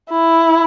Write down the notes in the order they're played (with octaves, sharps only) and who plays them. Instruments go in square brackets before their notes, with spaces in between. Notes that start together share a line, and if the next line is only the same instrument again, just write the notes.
[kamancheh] E4